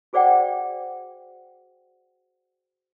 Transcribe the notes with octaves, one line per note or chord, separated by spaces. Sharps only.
F#4 G#4 C5 D5 F#5 G5